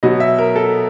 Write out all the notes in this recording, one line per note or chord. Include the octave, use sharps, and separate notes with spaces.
B2 F#3 D#5
E5
A#4
A4